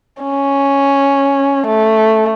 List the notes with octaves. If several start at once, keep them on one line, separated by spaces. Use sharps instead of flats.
C#4
A3